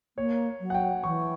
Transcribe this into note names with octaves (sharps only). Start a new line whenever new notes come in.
A#3 C#5
F#3
F#5
G5
E3 C#6